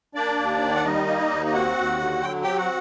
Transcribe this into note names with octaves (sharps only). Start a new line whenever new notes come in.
A#3 D4 D5
D#2
D#3
F#5
G3 D#4 D#5
A#3
D#2
D#5
C4 F#4 F#5
D#2
D3
F#3 G5
C4 G4 G5
F#4 F#5